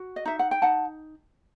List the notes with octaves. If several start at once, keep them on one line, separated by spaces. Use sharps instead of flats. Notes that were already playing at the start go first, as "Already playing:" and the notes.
Already playing: F#4
D#5
D#4 E5
F#5
G5
D#4 F#5 A5